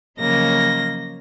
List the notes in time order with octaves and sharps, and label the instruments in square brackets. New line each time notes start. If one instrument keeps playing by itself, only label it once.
[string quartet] C#3 F3 F#3 A#3 D#5 A#6